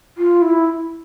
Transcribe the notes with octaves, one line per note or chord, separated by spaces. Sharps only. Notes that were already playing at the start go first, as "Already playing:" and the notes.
F4
E4